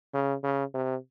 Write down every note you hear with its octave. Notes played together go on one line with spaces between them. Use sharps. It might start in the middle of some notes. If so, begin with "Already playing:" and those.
C#3
C#3
C3